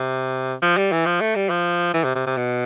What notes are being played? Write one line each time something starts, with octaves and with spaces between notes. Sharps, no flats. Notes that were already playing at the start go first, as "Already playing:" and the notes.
Already playing: C3
F3
G3
E3
F3
A3
G3
F3
E3
C3
C3
C3
B2